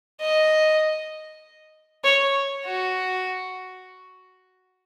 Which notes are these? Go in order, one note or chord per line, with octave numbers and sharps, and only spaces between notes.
D#5
C#5
F#4